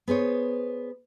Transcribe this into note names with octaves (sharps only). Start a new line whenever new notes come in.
B3 G#4 C5 C#5